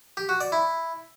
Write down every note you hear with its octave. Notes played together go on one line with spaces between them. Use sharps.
G4
F#4
D5
E4